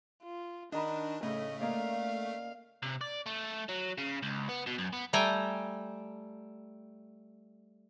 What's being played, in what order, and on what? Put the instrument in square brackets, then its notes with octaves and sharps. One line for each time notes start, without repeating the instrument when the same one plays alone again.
[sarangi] F4
[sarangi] D#3 [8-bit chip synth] D4 [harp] D#5 A#5 B5
[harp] A2 C#3 [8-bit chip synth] A3 [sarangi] D#5
[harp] A#3 D5 D#5 [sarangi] F5
[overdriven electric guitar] C3
D5
A3
F#3
C#3
C#2
B3
B2
F#2
B3
[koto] G3 A3 G5 G#5 A#5